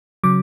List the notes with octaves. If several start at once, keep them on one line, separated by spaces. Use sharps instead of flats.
C#3 F#3 D6